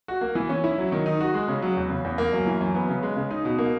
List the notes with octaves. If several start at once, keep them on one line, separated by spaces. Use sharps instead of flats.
F#4
A#3
E3
C#4
E4
F#3
D#3
D#4
F#4
G#3
C#3
F#3
E2
C#3
E2
A#3
F#2
E3
F#2
B3
C#3
G#3
C#3
D#4
B2
A#3